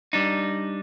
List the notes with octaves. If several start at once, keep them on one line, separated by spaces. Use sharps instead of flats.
G3 D4 D#4